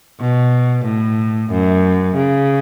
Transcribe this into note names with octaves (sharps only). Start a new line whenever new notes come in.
B2
A2
F#2
C#3